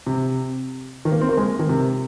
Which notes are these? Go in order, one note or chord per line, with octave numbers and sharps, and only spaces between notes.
C3
D#3
A#3
C4
A#3
G#3
D#3
C3